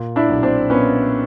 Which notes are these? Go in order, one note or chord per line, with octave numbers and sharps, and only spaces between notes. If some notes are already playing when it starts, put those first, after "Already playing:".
Already playing: A#2
D4 E4
B1
C4 D4
A#2 B3 C#4